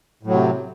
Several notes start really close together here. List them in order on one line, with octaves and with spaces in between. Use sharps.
A2 F#3 C3